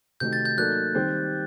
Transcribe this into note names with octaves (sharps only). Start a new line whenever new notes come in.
C3 D#3 A3 D#4 F#4 G6
A6
G6
F#3 A#3 D#4 A4 D5 F#6
D#3 G3 C4 G4 C5